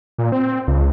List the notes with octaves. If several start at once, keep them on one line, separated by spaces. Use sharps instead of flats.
A#2
C4
C#2